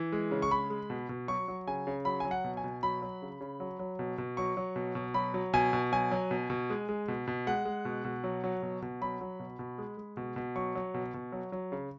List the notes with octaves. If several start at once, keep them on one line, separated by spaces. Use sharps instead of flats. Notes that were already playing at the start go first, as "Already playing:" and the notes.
Already playing: E3
G#3
C#3
C#6
G#3 B5
G#3
B2
B2
F#3 C#6
F#3
C#3 G#5
C#3
F#3 B5
F#3 G#5
F#5
B2
G#5
B2
F#3 B5
F#3
C#3
C#3
F#3
F#3
B2
B2
F#3 C#6
F#3
B2
B2
F#3 B5
F#3
B2 G#5
B2
F#3 G#5
F#3
B2
B2
G#3
G#3
B2
B2
G#3 F#5
G#3
B2
B2
F#3
F#3
B2
B2
F#3 B5
F#3
B2
B2
G#3
G#3
B2
B2
F#3 C#6
F#3
B2
B2
F#3
F#3
C#3